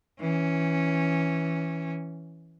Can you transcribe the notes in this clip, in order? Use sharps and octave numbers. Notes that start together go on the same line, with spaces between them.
E3 C#4